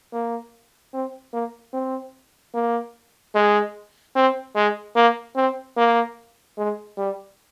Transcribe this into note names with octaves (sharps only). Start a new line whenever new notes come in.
A#3
C4
A#3
C4
A#3
G#3
C4
G#3
A#3
C4
A#3
G#3
G3